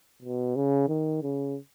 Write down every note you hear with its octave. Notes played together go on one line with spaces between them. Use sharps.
B2
C#3
D#3
C#3